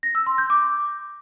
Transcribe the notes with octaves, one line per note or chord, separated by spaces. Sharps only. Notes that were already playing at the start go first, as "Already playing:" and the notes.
A#6
E6
C6
G6
D6